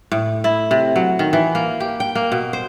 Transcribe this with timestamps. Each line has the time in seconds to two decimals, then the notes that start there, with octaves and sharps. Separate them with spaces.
0.12 A2
0.44 E4
0.71 C3
0.96 F#3
1.19 D#3
1.33 E3
1.55 A#3
1.80 G4
2.00 G5
2.15 A#3
2.32 B2
2.53 C5